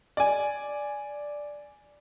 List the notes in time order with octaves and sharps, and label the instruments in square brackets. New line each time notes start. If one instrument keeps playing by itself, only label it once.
[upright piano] D5 G#5